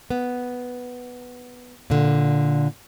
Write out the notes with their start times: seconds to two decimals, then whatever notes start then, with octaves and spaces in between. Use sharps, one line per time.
0.10 B3
1.90 A#2 D3